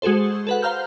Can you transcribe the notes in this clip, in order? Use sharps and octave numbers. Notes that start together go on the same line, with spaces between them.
G#3 F#4 G#4 A4 C5
A4 B4 F#5
C5 F5 A#5 F6 G6